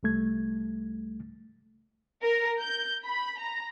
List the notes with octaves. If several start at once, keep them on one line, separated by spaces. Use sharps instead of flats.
C2 G3 A3 G#6
A#4
G6
B5
A#5